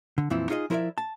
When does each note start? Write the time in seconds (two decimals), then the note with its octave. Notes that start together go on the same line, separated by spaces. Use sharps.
0.18 D3
0.30 F2 A#2 E3 F3 C4 E4
0.50 D#4 F4 G#4 C#5 D#5
0.70 F3 E4 A#4 B4 D5 E5
0.98 A5